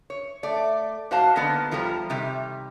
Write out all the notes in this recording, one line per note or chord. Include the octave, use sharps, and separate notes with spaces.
C#5
A3 D5
G#2 F#4 C5 F5 A5
D3 D#3 A#3 B3 D4
E2 F3 G3 A4 A#5
C3 D#3 G3